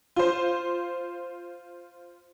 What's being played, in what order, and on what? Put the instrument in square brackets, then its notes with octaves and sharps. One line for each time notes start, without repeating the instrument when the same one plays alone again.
[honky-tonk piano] F4 C5